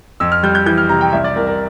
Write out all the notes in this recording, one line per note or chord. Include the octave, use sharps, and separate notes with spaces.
F2 E6
F6
G3 G6
G6
E3 G6
F6
C3 A#5
G5
C2 E5
D5
C2 A#4
A#4